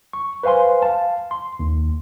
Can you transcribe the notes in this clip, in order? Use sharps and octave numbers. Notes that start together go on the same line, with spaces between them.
C#6
B4 C5 F5 G#5 C6
F5 A5
C6
D#2